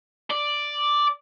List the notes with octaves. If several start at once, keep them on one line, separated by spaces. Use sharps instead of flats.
D5